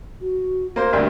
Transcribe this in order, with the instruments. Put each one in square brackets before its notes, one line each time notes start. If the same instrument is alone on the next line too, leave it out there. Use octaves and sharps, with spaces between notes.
[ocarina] F#4
[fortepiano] A#3 C5
[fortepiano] D2 G2 G5 [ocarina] D5